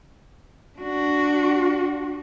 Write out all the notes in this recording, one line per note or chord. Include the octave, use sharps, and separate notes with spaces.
D4 F#4